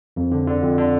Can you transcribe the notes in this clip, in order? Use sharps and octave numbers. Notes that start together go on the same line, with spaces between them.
F2
D3
D3
F2
D3